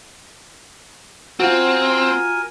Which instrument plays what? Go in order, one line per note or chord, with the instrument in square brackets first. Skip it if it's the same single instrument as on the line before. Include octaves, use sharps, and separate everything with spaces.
[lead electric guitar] C4 [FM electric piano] F4 F#4 [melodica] A#4 G#5